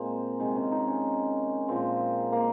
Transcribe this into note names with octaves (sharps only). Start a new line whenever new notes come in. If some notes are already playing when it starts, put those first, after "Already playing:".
Already playing: A#2 G#3 A#3 C4
C3 D#3 G#3
C#4
D#4
C#4
A#2 F3 G#3 C4
A#3